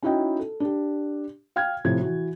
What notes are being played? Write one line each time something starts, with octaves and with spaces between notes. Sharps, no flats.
C#4 D#4 E4 F#4 D#5 G5
A4
D4 G4
F5 G5 F6 G#6
A2 C3 F3 G#6
E3 F#4